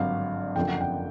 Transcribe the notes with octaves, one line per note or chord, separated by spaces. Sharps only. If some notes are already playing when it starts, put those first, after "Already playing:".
Already playing: G#1 G2 D3 F#3 F5
F#1 F2 D3 F3 G5
F#5
G5